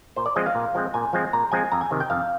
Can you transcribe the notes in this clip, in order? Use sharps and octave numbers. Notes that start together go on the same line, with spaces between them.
A#2 C5
D5
F3 G#3 C4 D#5
F5
A#2
F3 G#3 C4
A#2 G#5
F3 G#3 C4
A#2 A#5
F3 G#3 C4 G#5
F2 A#5
G#5
C3 D#3
G5
F2 F5